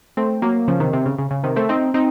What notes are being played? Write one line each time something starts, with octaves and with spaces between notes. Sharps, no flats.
A3 C4
F#3 A#3
C#3 F3
C3 D#3
C3
C#3
C#3
C#3
C3 D#3
A3 C4
C4 D#4
C4 D#4